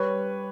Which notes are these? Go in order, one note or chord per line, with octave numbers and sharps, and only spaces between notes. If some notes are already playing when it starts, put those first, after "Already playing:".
Already playing: G3 B4 C#5